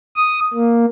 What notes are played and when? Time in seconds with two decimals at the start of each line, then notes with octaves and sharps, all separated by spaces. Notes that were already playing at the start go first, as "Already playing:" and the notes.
0.16 D#6
0.54 A#3